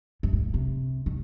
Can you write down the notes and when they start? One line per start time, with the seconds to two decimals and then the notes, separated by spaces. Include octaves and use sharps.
0.23 G2
0.33 A2
0.54 C3
1.06 D#3